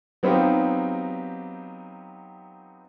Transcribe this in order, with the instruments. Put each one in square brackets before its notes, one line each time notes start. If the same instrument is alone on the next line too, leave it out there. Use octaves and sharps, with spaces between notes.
[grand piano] F#3 B3 C4 D#4 F4 G4